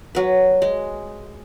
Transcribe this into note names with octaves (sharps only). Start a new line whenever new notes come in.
F#3 B4
G#3